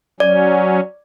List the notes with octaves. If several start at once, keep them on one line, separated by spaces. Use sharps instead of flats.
F#3 C#4 D5